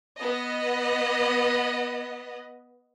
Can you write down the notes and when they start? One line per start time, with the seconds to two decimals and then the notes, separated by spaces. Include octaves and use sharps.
0.18 B3 D#5